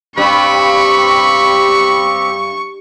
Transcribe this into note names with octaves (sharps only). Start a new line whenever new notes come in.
G2 C4 G4 B5 C#6